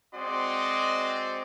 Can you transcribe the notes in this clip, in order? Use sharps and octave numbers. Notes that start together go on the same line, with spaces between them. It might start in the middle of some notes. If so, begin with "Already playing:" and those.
G#3 C4 F#4 D5 D#5 C6